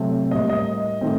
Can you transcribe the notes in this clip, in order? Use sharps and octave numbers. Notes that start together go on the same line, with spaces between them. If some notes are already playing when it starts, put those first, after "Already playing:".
Already playing: C3 F#3 A3 C4
A2 G3 A#3 D#5
D#5
D#3 A3 C4